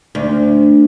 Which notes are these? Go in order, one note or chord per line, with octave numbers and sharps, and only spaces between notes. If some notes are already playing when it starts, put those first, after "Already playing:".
D2